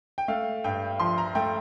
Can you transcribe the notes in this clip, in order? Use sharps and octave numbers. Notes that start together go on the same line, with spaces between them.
G5
A3 F5
G2 G5
F3 C6
A#5
A3 G5